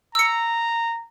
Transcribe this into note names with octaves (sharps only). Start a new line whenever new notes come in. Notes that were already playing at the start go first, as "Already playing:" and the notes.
A#5 E6 C#7